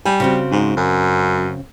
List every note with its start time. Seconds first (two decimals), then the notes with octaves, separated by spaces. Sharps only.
0.05 G3 G#5
0.20 C#3 C4 F#4
0.51 G#2
0.76 F#2